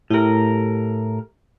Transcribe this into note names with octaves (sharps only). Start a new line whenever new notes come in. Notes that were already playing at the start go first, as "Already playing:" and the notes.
A2 E4 G4 A#4